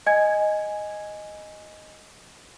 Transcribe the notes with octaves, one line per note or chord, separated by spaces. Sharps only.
D#5 G#5 G#6